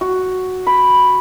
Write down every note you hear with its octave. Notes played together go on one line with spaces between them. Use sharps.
F#4
B5